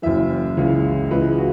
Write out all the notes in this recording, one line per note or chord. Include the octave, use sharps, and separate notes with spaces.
F#1 F#2 E3 E5
C#2 C#3 E3
C#2 C#3 E3 B4
F#4